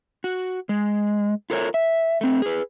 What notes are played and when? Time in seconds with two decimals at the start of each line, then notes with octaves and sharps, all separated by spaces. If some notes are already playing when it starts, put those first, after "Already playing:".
0.24 F#4
0.69 G#3
1.50 F4 A4 A#4 C#5
1.74 E5
2.21 A3 C4
2.42 G#4 B4